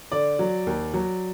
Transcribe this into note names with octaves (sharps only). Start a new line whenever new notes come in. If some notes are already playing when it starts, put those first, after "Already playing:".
D3 D5
F#3
D#2
F#3